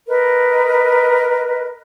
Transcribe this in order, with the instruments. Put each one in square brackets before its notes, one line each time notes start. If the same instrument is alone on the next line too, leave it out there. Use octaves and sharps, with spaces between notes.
[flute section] A#4 B4 D#5